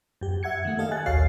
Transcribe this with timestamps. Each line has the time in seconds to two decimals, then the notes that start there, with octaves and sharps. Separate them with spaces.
0.21 F#2 G4
0.43 E5 F#5 G#6 C#7
0.65 D#3 A3
0.78 G4 A4 D#5 F5
0.91 G#5 F#6 A6
1.06 A#1 D#2 F#4 C#5 F5 C7